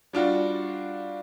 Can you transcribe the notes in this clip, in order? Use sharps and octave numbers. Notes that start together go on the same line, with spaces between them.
G3 D4 F4 F#4